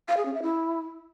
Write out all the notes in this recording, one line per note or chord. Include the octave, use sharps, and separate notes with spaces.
F5
G#4
C#4
E5
E4